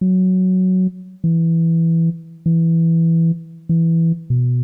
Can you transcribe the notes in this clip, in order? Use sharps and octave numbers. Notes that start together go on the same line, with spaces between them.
F#3
E3
E3
E3
B2